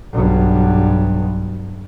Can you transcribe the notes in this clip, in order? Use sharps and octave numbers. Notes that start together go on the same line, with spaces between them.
B1 G2